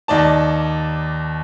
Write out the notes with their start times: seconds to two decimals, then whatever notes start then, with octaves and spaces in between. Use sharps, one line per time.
0.08 D#2 D#4 D5 A5